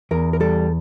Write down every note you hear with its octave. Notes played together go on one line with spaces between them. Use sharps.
E2 A#4
A#4
G3 A4